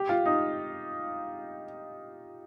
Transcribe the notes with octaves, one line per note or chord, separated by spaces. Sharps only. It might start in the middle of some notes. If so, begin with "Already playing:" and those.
Already playing: G4
F4
D#4